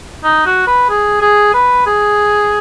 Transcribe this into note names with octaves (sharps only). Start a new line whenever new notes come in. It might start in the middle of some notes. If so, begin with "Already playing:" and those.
D#4
F#4
B4
G#4
G#4
B4
G#4